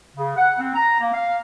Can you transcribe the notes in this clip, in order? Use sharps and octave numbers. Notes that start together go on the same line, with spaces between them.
C#3
F#5
C4
A#5
A#3
F5